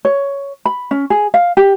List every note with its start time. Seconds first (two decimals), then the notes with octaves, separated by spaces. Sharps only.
0.05 C#5
0.66 B5
0.91 C#4
1.10 G#4
1.34 F5
1.57 G4